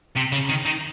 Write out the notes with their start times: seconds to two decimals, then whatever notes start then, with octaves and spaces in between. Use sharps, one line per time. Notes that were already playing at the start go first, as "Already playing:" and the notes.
0.16 C3
0.32 C#3
0.49 D#3
0.65 D#3